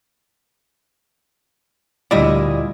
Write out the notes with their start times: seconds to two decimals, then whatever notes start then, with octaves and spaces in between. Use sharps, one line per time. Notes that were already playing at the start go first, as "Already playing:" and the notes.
2.11 D2 A#2 G3 E4 D5 D#5